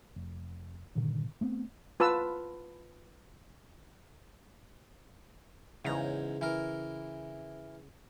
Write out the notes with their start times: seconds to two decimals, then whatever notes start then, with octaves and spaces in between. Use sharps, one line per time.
0.16 F1
0.95 G2 A#2 D3 D#3
1.41 A3 B3 C4
2.00 F4 B4 A5 E6
5.85 E2 G#2 C#3 A#5
6.41 E3 A#4